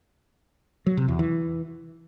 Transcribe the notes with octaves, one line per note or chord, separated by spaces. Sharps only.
F#3
C3
E2
E3